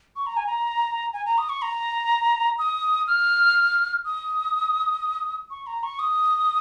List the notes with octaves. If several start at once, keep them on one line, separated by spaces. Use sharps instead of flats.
C#6
A#5
G#5
A#5
G#5
A#5
D#6
C#6
A#5
D#6
F6
D#6
C#6
A#5
C#6
D#6